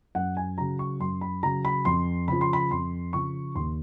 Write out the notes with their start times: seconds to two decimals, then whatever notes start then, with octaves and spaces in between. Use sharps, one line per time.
0.15 F#2 F#5
0.37 G#5
0.58 C#3 F#3 A#5
0.79 C#6
1.00 F#2 C6
1.21 B5
1.43 C#3 F#3 A#5
1.65 B5
1.85 F2 C6
2.28 C#3 F3 B5
2.41 C6
2.53 B5
2.71 F2 C6
3.13 C#3 F3 C#6
3.55 D#2 C6